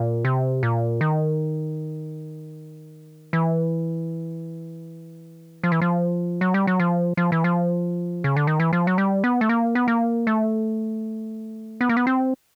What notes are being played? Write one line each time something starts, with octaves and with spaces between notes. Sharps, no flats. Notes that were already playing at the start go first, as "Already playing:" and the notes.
Already playing: A#2
C3
A#2
D#3
E3
F3
E3
F3
F#3
G3
F#3
F3
F3
E3
F3
C#3
D3
D#3
E3
F3
F#3
G3
B3
A3
A#3
B3
A#3
A3
B3
A#3
B3
C4